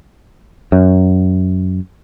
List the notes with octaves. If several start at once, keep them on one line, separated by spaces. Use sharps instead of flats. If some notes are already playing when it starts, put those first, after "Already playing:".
F#2